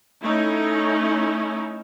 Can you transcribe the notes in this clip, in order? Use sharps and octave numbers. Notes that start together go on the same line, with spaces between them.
A3 C#4 D#4 E4